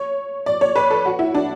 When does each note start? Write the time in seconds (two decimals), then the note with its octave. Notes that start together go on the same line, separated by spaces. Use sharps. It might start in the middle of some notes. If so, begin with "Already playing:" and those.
Already playing: C#5
0.46 D5
0.61 C#5
0.76 B4
0.90 A4
1.05 F#4
1.19 E4
1.34 D4